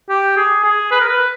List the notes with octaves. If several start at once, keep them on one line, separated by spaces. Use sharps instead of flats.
G4
G#4
G#4
B4
A#4
B4